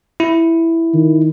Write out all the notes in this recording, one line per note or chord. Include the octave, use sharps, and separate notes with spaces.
E4
D#3